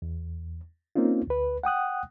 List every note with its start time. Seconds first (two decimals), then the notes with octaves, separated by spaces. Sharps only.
0.02 E2
0.96 A#3 C4 C#4 D#4 F4
1.27 D2 B4
1.63 F#5 G5 D#6 F#6